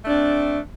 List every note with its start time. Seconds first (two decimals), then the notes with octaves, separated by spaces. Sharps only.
0.04 A3
0.07 D4
0.10 C4